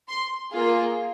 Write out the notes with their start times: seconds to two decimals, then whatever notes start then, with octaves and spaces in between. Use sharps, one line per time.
0.09 C6
0.52 A#3 F4 G#4